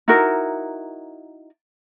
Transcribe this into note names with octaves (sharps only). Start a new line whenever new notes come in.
D#4 E4 F#4 A#4